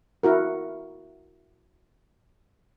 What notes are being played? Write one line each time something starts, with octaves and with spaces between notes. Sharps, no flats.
E4 F#4 A#4